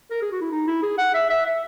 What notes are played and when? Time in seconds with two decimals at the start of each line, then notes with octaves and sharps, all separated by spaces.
0.10 A#4
0.22 G#4
0.32 F#4
0.41 E4
0.51 D#4
0.67 E4
0.82 G#4
0.98 F#5
1.14 E5
1.30 E5
1.45 E5